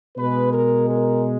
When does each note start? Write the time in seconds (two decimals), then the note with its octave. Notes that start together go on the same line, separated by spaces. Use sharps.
0.17 B2 G#3 B4
0.52 A#4
0.89 A#4